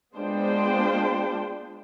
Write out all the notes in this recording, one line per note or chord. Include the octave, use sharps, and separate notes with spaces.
G#3 B3 D4 F4 C5 G5